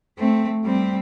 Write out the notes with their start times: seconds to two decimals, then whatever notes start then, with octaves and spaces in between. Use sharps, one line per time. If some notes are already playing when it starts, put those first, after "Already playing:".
0.19 A3 C4
0.64 G3 C4